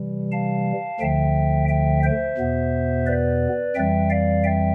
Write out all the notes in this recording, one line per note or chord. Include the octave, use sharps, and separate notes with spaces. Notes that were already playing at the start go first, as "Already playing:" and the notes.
Already playing: C3 E3 G3
F5 A5
D2 D3 F3 E5 G5
E5 G5
C5 E5
E2 B2 B3
B4 D5
F2 E3 G3 E5 G5
D5 F5
E5 G5